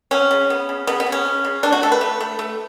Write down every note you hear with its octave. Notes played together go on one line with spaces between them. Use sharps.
F#3 C#4
C#3
B3
C#3
C#3 B3
B3
C#3
C#4
C#3
C#3
A3 D4
F#4
A3 A4
B4
A3
A3
A3